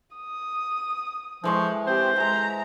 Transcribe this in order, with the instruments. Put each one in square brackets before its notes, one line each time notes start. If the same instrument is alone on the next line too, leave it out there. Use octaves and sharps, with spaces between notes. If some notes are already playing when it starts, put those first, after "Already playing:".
[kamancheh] D#6
[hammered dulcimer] E3 G#3 C#6 [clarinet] F3
[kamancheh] C4 G4 [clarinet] C5
[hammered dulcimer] G#3 A5 [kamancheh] E5 A#5